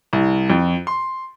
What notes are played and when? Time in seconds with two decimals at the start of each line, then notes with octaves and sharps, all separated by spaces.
0.13 C2
0.50 F2
0.87 C6